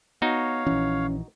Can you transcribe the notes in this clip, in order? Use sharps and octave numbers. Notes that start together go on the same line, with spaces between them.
B3 D#4 F#4 C#5 F5
A#1 E3 C#4